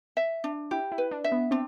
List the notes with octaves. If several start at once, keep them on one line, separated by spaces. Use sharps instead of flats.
E5
D4
E4 G4
E4
B4
D4
E5
B3
C4 D4